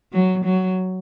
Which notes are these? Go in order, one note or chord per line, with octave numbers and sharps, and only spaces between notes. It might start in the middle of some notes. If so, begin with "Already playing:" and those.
F#3
F#3